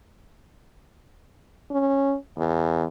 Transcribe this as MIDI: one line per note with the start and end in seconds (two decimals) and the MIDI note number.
1.71 2.15 61
2.37 2.84 40